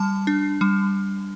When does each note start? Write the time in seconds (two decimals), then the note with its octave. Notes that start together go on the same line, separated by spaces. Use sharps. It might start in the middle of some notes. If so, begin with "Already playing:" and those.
Already playing: G3 A5
0.27 D4
0.61 G3